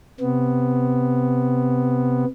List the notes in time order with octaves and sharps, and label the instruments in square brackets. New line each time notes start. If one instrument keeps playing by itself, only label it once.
[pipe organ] C3 B3